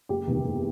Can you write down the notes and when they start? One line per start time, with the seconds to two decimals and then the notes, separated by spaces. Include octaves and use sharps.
0.09 F#1 G4
0.27 E2 C3 D#3
0.44 F#1